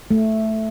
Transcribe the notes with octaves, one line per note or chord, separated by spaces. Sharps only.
A3